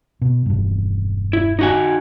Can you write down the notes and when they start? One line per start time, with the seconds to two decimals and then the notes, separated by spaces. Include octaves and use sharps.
0.21 B2
0.46 E1 G2
1.33 E4
1.59 D#4 F#4 G#5